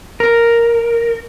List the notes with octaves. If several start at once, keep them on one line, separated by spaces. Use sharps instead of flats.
A#4